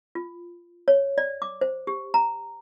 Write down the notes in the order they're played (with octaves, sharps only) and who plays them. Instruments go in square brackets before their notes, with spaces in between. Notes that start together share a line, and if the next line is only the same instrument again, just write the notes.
[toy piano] F4
C#5
D5
D6
C5
G4
A#5